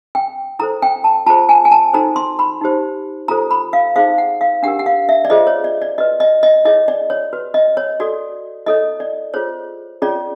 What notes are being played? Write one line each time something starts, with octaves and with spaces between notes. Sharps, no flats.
G5
E4 A4 C5 A#5
G5
A5
F4 G#4 C5 A5
G#5
G#5
A5
D#4 F#4 A4 C5 A#5
C6
B5
D#4 G4 C5
F4 A4 C5 A#5
B5
F5
D#4 G#4 C5 F5
F#5
F5
D4 G4 A#4 F#5
F#5
F5
E5
D5
F4 G#4 C5 D#5
C#5
D5
D5
F#4 B4 D#5
D#5
D#5
E4 G#4 C#5 D#5
D5
C#5
F#4 B4
D#5
C#5
F#4 A4 C#5 D5
E4 A4 C#5 D#5
D5
F4 G#4 C5 C#5
C#4 F4 G#4 C#5 D5